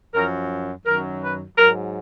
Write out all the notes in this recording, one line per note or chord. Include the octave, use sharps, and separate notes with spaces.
F#2 F3 A#4
F#2 D#3 F#3 A#4
B4
G#2 F#3 A#4